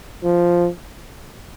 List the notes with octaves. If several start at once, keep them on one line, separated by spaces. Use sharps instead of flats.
F3